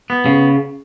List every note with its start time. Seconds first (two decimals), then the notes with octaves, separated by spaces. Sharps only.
0.10 B3
0.26 C#3